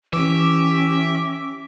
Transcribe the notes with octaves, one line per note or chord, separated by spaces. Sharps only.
E3 C#4 G4 E5 D6